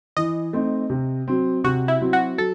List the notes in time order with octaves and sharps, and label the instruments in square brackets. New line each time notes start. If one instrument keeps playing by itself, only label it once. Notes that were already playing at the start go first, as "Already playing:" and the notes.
[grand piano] E3 [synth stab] D#5
[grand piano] A3 C4 D#4
C3
F#3 C4
[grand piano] C3 [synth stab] F#4
[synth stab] E4
[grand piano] F#3 C4
[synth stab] F#4
[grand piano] F#3 [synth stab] A4